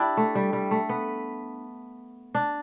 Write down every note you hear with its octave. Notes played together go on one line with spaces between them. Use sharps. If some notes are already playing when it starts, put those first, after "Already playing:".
Already playing: D4 E4 G4
A3
G3
G3
A3
B3
D4